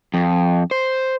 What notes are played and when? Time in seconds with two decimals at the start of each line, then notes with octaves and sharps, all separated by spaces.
0.14 F2
0.71 C5